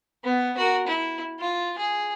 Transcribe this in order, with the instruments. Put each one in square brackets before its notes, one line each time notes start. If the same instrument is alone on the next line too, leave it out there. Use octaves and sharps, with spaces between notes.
[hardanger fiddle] B3
F#4 A#4
E4
F4
G#4